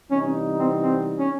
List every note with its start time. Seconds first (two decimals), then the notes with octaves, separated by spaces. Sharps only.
0.11 C3 E3 G3 B3 C#4 D#4
0.59 C4
0.83 C4
1.19 C#4